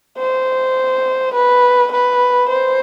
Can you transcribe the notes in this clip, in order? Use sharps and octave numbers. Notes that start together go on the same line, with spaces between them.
C5
B4
B4
C5